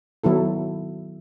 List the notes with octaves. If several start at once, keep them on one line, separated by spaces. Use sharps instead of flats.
D#3 F#3 B3 E4 A4